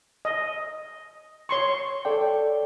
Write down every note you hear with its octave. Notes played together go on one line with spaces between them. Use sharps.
D#5
C#5 C6 C#6
A4 D5 G5